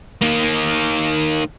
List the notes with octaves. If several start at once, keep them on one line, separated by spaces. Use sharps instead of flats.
D#3 A#3